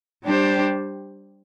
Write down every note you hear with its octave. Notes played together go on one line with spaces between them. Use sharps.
G3 D4 G4 C5